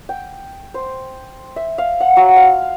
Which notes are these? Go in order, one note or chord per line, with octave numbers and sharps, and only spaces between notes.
G5
C5
E5
F5
F#5
F#3
F5